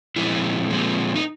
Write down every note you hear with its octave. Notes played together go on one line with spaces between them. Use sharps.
A#2 F3 G#3 C4 E4
A#2 F3 G#3 C4
D#4